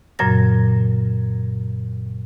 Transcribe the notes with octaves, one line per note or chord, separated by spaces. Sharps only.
F#2 A#2 C#3 F#3 G#6 A#6